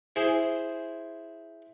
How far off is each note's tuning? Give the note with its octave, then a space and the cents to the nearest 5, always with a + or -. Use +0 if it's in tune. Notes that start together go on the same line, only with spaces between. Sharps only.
E4 +0 G#4 +0 C5 +0